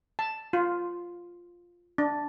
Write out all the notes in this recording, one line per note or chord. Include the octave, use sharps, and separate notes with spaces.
A5
F4
D4